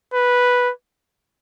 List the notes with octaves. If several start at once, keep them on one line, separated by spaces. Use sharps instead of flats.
B4